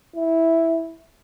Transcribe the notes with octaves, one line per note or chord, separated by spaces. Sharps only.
E4